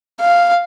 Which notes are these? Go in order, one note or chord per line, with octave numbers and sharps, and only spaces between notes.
F5